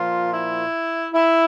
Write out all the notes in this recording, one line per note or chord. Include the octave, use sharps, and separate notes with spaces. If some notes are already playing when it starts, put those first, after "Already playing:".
Already playing: A#2 F3 F4
E4
E4